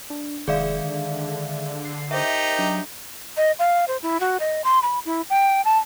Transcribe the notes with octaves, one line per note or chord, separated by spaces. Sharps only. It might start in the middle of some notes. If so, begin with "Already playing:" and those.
D4
F1 D#3 G#3 G#4 D5 E5 F5
D3
C7
D#4 G4 A#4 C5 E5
F#3 D4
D#5
F5
C5
E4
F#4
D#5
C6
B5
E4
G5
A5